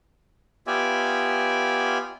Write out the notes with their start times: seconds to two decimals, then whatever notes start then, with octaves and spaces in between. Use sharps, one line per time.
0.67 B3 F4 G4 D5 E5 G#5